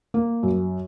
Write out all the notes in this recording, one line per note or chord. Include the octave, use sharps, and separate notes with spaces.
A#3
F#2